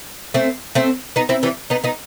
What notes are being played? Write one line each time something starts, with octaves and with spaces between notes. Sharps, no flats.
A3 C4
A3 C4
B3 D#4
C4 E4
E3 G3
B3 D#4
B3 D#4